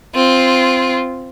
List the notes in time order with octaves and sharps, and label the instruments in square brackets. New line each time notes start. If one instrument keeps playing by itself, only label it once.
[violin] C4 F4